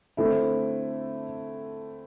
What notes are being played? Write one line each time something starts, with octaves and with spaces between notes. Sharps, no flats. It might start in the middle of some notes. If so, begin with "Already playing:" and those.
D3 A3 C4 E4